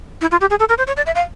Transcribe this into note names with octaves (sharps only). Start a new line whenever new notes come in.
E4
F4
G4
G#4
A4
A#4
C5
C#5
D5
E5
F5